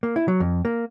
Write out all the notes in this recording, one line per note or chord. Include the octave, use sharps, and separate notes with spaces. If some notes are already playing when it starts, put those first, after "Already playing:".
A#3
E4
F#3
F2
A#3